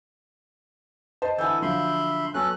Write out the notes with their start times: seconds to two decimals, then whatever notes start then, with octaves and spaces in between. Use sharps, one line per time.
1.22 C5 D#5 A5
1.38 D3 E3 E4 A4 G#5 G6
1.62 D3 F3 F#3 E5 B5 C6
2.34 F#3 B3 C#4 A4 F#6